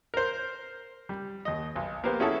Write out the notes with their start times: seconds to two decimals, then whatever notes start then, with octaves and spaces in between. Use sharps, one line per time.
0.14 A#4 C5
1.09 G3
1.45 D#2 D#5
1.76 B1
2.04 A#3 B3 G4 C5
2.20 C#4 E4 F#4 G#4 A4